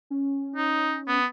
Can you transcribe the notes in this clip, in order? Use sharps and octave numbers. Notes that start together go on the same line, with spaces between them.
C#4
D#4
B3